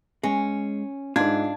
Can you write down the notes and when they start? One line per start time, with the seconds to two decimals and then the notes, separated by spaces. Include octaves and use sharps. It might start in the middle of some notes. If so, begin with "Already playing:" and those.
0.23 G#3 C#4
1.16 G#2 D4 F4 G#6